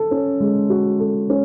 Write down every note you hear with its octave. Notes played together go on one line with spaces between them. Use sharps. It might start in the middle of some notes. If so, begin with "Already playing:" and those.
Already playing: A4
C#4
G#3
F#4
A4
C#4